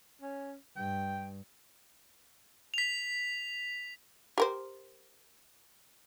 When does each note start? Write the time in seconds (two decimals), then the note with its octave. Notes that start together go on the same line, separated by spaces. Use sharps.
0.22 C#4
0.77 G2 G5
2.74 B6 F7
4.38 G4 A#4 C5